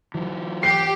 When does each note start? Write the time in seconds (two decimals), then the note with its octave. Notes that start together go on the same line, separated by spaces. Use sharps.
0.14 E3 F#3
0.63 G4 C7